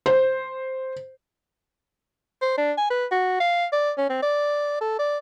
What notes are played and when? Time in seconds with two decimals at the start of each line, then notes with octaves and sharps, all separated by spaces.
0.06 C5
2.42 C5
2.58 D4
2.78 G#5
2.91 B4
3.12 F#4
3.40 F5
3.73 D5
3.98 C#4
4.10 C4
4.23 D5
4.81 A4
4.99 D5